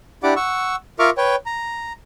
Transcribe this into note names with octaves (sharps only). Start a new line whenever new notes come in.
D4 E4 G4 D5 F#5 D6
F#5 C#6 E6
F4 A#4 E5 C#6 D6 F6
B4 C#5 G5
A#5